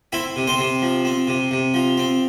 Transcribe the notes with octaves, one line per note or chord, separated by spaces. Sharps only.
C4 E4 E5
C3
C4 C5
C3
F3
C4
C3
C3
F3
C4